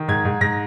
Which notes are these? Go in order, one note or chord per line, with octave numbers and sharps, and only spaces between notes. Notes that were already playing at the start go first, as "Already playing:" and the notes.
Already playing: D#3
G#2 G#6
G#2
G#2 A#6